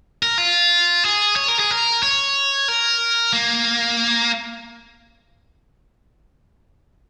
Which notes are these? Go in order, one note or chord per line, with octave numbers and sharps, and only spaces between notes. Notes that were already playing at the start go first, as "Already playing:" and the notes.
A#4
F4
G#4
C#5
A#4
G#4
A#4
C#5
A#4
A#3